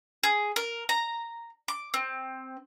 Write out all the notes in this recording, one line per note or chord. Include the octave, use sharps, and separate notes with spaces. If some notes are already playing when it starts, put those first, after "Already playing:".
G#4
A#4
A#5
D6
C4